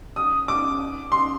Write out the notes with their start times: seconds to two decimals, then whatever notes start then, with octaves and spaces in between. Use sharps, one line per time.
0.16 D#6
0.48 D6
1.12 C6